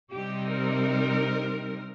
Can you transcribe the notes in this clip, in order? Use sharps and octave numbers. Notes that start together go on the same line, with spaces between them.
C3 G3 C4 D#4 G4
A#4